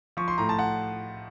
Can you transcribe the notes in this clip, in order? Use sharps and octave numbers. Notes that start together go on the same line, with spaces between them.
F3 C#6
C6
A2 A#5
A5
F#5